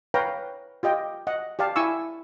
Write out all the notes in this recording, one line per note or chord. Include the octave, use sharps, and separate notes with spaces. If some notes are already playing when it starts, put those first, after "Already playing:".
B4 C#5 F5 G5 A#5
F4 G4 D#5 G5
D#5 F#5
G4 D5 F5 A5
E4 G#5 C#6 E6